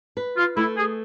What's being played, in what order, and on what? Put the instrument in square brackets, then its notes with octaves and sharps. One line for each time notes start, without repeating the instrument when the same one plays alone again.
[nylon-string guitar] B4
[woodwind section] F4
[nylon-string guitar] A3 [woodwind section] E4
[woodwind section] G#4